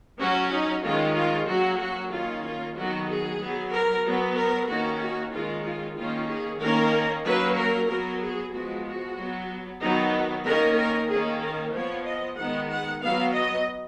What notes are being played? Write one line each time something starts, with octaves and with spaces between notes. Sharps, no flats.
F#3 C#4 F#4
D#4
D#3 G#3 C#4 F4
F4
F#3 A#3 C#4 F#4
F#4
D#3 A#3 C#4 F4
F4
D#3 F#3 B3 F#4
G#4
F#3 B3
A#4
F#3 B3
A#4
D#3 A#3 C#4 F#4
F#4
D#3 G#3 C#4 F4
F4
D#3 A#3 C#4 F4
G#4
D#3 A#3 C#4 A#4
F#3 A#3 C#4 B4
A#4
F#3 B3 A#4
G#4
F3 G#3 B3 F#4
F#4
F#3 B3
D#3 F#3 B3 D#4
D#3 A#3 C#4 A#4
A#4
D#3 A#3 C#4 G#4
A#4
F3 B3 C#5
D#5
D#3 G#3 B3 F#5
F#5
F#3 B3 F5
D#5